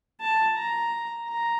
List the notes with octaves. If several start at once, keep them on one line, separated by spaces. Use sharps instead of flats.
A5
A#5
A#5